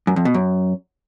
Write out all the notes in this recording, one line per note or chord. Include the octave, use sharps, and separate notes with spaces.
F#2
F2
B2
F#2